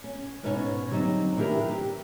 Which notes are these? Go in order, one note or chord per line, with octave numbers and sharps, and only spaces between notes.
C#4
G#2 B2 C#4 D#4 G4 C#5
D3 F#3 G3 C4 D#4
D#3 E3 D4 E4 G4 A#4
G4